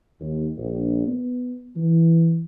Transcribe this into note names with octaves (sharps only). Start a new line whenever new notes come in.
D#2
A#1
B3
E3